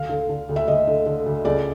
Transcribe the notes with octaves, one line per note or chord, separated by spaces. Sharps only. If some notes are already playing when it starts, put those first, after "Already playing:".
Already playing: D2 F5
D3
D3
D2
E5
D2 D#5
D3
D3
D2
C#2 D5